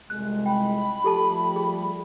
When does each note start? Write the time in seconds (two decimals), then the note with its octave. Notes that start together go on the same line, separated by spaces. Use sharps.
0.10 C2 F2 G#3 F#6
0.46 G5 B5
1.04 F3 G3 A3 G4 A4 A5
1.56 G#4